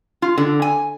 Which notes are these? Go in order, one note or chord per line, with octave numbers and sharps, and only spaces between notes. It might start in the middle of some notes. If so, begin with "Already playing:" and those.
F4
D3
G#5